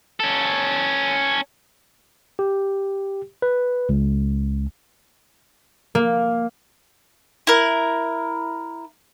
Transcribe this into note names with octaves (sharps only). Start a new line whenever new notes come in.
C#4 A4
G4
B4
C#2
A#3
E4 A#4